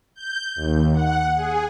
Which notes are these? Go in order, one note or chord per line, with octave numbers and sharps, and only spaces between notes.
G6
D#2
F#5
G#4